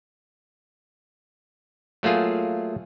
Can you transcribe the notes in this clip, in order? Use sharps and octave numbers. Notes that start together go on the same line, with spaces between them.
F#3 A3 A#3 F4 G#4